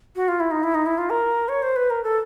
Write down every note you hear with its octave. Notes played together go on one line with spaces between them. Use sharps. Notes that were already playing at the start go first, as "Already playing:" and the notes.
F#4
F4
E4
D#4
E4
D#4
E4
F4
A#4
C#5
C5
B4
A#4
A4